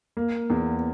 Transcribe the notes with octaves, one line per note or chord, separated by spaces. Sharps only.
A#3
E2